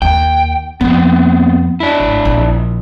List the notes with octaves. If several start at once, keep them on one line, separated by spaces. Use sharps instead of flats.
D#2 G5
F2 B3 C4
D4 E4
G#1
A#1